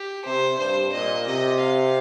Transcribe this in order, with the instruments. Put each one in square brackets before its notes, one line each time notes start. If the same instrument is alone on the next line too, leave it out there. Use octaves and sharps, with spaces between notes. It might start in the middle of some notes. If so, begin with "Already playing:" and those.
Already playing: [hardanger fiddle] G4
[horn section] C3 [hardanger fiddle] C5
[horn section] G2 [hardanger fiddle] C5
[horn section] A#2 [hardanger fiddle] D#5
[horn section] C3 [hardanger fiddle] D#5
[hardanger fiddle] F5